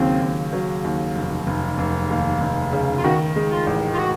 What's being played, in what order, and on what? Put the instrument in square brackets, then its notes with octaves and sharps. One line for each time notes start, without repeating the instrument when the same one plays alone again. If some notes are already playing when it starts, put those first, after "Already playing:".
Already playing: [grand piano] D#2 C#3 F#3 [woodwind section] C4
[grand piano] D#2
F#3
D#2
F1
F1
F1
D#2
F1
C#3
[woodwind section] F4
[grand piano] D#3 [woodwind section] F#4
[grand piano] G#3
[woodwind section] F4
[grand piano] A1
[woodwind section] F4
F#4